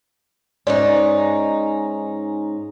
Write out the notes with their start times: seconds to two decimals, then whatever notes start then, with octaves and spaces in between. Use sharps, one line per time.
0.67 G#2 C#4 D#4 D5